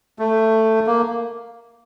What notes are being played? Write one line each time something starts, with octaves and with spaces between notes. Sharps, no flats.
A3
A#3